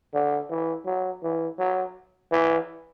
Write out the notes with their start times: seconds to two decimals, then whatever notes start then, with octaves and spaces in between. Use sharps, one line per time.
0.14 D3
0.50 E3
0.86 F#3
1.23 E3
1.59 F#3
2.31 E3